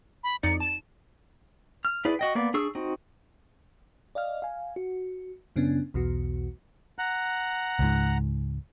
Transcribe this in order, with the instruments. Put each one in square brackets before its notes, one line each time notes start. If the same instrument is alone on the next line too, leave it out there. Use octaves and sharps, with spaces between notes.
[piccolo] B5
[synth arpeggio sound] F2 D#4 D5 [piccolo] C#7
[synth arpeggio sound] A5 [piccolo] E7
[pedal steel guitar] F6
E4 G#4 B4 D5
F#4 D#5 G5
A#3 B3 D5
D4 G#4 C#6 E6
C4 D#4 F#4
[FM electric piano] D5 D#5 F5 F6
F5 G#5
F#4
F#2 C#3 B3 C#4 D4
B1 E2 B2 F#4
[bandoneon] F#5 A#5 F#6
[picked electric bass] C#2 G#2